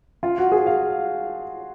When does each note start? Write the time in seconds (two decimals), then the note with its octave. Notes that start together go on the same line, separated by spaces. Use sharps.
0.23 F4
0.38 F#4
0.52 G#4
0.67 F5